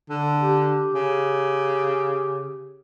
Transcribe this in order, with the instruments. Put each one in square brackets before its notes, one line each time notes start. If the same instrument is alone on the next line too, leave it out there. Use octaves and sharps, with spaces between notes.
[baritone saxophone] D3
[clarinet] G4
[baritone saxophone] C#3